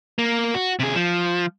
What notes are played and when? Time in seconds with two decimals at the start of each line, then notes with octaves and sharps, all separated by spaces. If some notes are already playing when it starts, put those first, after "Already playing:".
0.19 A#3
0.54 F#4
0.79 C3 G#4
0.95 F3